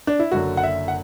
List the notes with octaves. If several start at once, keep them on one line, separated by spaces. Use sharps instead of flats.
D4
E4
F#1 F#2 D3 F#3 F#4
F#5
E5
F#5